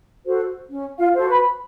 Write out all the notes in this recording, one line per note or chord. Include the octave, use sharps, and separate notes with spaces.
F#4 A4 C5
C#4
F4 F5
F#4 A4 C5
B4 B5